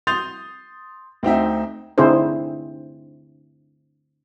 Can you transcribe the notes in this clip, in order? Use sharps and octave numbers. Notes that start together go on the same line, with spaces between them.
C6 D#6 G6 A6 F7
D2 C4 D#4 E5
D3 C4 D#4 E4 G#4 C5